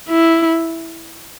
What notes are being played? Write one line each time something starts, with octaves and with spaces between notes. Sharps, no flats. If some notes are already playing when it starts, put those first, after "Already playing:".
E4